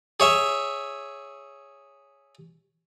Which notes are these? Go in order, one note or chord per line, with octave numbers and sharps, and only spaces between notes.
G#4 C#5 E5